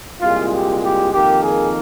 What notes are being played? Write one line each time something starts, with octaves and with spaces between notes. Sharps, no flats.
C2 A#2 G#3 F4
G4
G4
F2 D#3 A#3 G4
G#4